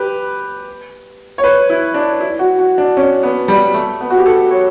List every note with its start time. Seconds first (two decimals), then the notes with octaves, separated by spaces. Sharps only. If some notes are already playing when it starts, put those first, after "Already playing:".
Already playing: G4 B4
1.38 C#5
1.44 B4
1.70 E4
1.94 D4
2.20 E4
2.39 F#4
2.59 F#4
2.78 D4
2.97 C#4
3.23 B3
3.48 G3
3.74 A3
4.01 B3
4.10 F#4
4.18 G4
4.26 A4
4.51 C#5